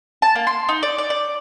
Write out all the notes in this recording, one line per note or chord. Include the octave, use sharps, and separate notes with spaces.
A5
A#3
C6
D#4
D5
D5
D5